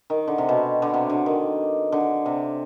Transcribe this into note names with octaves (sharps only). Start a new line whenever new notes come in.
D#3
D3
C3
B2
D3
C3
D3
D#3
D3
C3